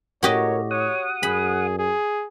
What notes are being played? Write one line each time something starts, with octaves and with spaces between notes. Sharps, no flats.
A2 F#4 G4 A#4 C#5 D#5
C#5 F#5 D#6
F#2 G#4 B5
G#4